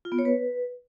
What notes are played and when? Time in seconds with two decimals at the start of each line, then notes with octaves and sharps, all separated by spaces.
0.05 F4
0.12 B3
0.19 C#5
0.25 B4